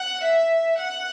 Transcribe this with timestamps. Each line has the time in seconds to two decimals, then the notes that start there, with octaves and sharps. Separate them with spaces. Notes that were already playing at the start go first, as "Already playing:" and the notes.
Already playing: F#5
0.23 E5
0.78 F#5